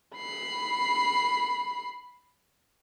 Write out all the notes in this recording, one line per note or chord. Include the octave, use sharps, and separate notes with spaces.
B5 C7